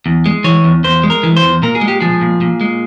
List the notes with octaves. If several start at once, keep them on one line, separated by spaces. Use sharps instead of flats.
E2
G#3
E3 C#5
E2
E2 C5
G#3
A#4
E3
C5
E2
A#2 A#4
G#4
G#3
G4
F3 G#4
A#2
A#2
G#3